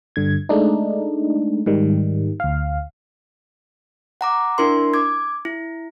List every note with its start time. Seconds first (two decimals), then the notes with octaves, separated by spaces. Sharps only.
0.16 G2 D3 G#6
0.49 G#3 A3 D4 D#4
1.66 G#2 D#3 G3
2.40 D2 F5
4.21 F#5 A#5 D6
4.58 D4 E4 A#4 C6
4.94 D6 G#6
5.45 E4